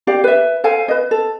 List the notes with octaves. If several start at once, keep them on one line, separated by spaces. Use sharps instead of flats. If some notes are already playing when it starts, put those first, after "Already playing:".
G4 D5 F5
B4 E5
A4 C5 F5 G#5
B4 D#5
A4